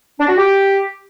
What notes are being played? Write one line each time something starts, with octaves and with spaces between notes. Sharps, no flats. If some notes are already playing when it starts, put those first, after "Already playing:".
D4
F#4
G4